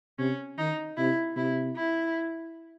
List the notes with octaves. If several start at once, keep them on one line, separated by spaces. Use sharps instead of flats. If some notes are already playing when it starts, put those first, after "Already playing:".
C3 C#4
D#3 D#4
C3 E4
C3 E4
E4